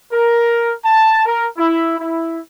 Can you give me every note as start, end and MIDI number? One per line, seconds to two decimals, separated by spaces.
0.13 0.73 70
0.85 1.22 81
1.26 1.47 70
1.58 1.97 64
1.99 2.39 64